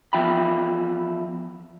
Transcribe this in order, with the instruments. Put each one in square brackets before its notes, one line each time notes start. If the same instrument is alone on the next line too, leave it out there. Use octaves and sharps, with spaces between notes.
[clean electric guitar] E2 F3 E4 G5 B5